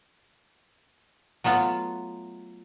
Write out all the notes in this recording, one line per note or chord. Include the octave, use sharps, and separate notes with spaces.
F#3 A3 B3 F4